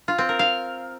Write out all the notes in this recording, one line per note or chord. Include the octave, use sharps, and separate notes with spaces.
F4
C4
A#4
F5